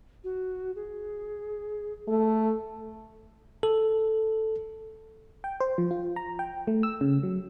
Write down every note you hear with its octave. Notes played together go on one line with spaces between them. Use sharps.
F#4
G#4
A3 A4
A4
G5
C5
F3
F4
A#5
G5
A3
E6
C#3
F#3